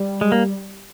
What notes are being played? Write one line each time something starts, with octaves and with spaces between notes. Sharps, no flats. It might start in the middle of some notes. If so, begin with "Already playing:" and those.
Already playing: G3
G#3
A#3